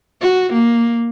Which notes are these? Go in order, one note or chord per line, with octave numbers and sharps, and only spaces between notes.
F#4
A#3